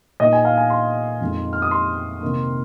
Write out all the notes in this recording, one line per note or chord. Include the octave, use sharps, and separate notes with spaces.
A#2 A#3 D#4 D#5
G#5
F5
G#5
C6
F2 D#3 G#3 D#4
F6
D#6
C6
C3 D#3 A#3 D#4